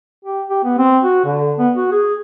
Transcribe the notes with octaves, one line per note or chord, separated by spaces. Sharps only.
G4
G4
B3
C4
F#4
D3
B3
F#4
G#4